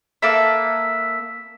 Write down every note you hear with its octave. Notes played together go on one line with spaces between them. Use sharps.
A#3 A4 B4 E5